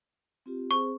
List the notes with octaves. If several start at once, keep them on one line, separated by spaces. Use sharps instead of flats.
C4 F4 G4
C4 G#4 C5 C#6